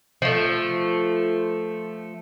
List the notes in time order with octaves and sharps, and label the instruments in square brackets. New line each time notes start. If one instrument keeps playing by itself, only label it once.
[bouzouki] F3 A3